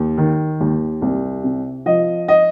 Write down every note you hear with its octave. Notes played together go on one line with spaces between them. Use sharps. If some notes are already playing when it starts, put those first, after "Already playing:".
Already playing: D#2
D#3
D#2
C2
C3
F3 D#5
D#5